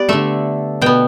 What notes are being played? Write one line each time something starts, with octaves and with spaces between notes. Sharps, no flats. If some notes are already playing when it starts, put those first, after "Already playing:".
Already playing: B3 G4 B4 D5
D3 A3 E5
B2 B3 G5